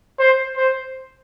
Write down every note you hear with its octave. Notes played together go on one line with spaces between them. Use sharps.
C5
C5